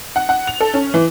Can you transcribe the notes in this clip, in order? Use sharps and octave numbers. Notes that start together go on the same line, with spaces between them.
F#5
F#5
F7
A4
C#4
E3